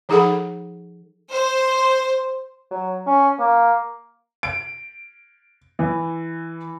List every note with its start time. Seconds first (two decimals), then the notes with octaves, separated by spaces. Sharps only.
0.09 F3 D#4 G#4 A4 F#5 B5
1.31 C5
2.71 F#3
3.07 C#4
3.39 A#3
4.43 D7
5.79 E3